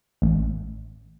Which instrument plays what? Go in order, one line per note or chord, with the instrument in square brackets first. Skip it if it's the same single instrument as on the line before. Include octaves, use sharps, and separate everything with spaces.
[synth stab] A1